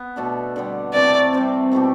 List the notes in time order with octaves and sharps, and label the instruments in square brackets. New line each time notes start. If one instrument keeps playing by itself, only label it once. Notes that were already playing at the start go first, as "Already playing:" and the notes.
Already playing: [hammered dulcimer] B3
B2 A3 D4 A4
D3 G3 B3
[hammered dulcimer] C3 E3 A3 C4 [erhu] D5
[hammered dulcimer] C3 G3 C4
B2 A3 E4 G4